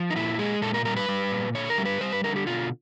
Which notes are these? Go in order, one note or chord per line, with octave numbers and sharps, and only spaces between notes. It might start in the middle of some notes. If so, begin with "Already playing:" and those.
Already playing: F3
D#4
A#2 E4
G#3 G#4
A#2 A4
A#4
G3 A#4
B4
G3
A#2
D3 C#5
A#4
G3
B4
G3 C5
B4
D3 A#4
G4
B2 F4